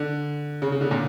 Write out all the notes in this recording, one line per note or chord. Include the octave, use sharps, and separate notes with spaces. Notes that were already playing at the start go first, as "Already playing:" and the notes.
Already playing: D3
C#3
C#3
D3
A#2